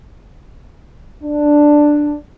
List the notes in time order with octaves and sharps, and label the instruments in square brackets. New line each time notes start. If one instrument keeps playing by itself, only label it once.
[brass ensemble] D4